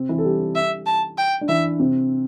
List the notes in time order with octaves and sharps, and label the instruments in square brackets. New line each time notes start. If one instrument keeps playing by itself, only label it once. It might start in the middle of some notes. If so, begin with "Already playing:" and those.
Already playing: [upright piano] C3 C4
E3 E4
A4
G3 G4
[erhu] E5
A5
G5
[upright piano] D4
[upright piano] E3 E4 [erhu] E5
[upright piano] C3 C4